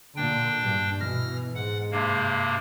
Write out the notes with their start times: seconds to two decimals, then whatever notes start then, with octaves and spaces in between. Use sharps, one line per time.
0.16 A#2 D3 D4 G5
0.61 G2
1.00 B2 E3 F6 A#6
1.55 G#2 F#5
1.92 G2 C3 A#3